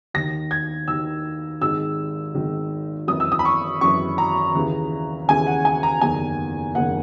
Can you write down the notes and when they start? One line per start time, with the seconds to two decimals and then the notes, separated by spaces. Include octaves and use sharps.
0.14 D#2 D#3 A#6
0.51 G#6
0.88 D#2 D#3 E6
1.61 G#1 G#2 D#3 E6
2.35 G#1 G#2 D#3
3.08 G#1 F#2 E3 D#6
3.20 E6
3.32 D#6
3.39 B5
3.45 C#6
3.81 G#1 F#2 E3 C#6
4.18 A#5
4.55 D#2 C#3 E3
5.28 D#2 C#3 E3 G#5
5.47 F#5
5.65 G#5
5.83 A#5
6.01 F#1 E2 D#3 G#5
6.75 F#1 E2 D#3 F#5